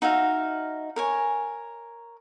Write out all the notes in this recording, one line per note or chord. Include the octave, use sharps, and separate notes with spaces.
D#4 F#4 E5 F5
A#4 C#5 G#5